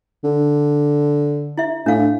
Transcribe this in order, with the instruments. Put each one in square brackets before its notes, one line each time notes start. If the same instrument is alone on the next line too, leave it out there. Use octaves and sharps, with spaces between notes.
[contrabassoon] D3
[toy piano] E4 E5
[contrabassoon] A2 [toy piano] D4 F5